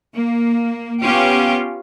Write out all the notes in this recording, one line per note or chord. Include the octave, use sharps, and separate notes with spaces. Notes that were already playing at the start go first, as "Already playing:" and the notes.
A#3
B3 C#4 F4 G4